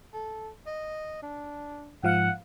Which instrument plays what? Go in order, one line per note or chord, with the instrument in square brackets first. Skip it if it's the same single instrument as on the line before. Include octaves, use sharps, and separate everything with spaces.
[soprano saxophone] A4
D#5
D4
[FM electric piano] G#2 F3 F5 [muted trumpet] F#5